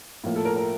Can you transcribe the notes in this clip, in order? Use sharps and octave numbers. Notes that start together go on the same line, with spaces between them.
A2 F3 A#3
A4
A#4
A#4